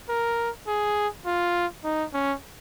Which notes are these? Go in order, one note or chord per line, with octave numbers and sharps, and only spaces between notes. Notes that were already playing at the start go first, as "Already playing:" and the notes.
A#4
G#4
F4
D#4
C#4